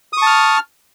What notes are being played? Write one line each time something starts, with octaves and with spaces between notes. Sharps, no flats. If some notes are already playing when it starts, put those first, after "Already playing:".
A5 C#6 D#6 F6